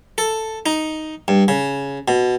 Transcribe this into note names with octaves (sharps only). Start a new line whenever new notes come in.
A4
D#4
G2
C#3
B2